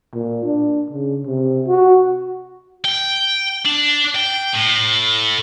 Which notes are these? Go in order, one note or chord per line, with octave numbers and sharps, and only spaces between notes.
A#2
D4
C#3
C3
F#4
G5
D4
G5
A2